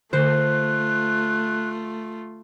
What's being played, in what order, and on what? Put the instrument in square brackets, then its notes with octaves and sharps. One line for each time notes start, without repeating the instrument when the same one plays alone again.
[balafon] D3 [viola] A3 F4 [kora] C5 [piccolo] F#6